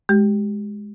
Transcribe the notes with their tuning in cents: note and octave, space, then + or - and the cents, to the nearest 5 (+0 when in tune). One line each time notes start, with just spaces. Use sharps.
G#3 +0 G4 -20